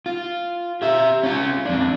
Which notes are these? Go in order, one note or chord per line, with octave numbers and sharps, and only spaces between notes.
F4
G4 E5
C#4 F4
F2 D4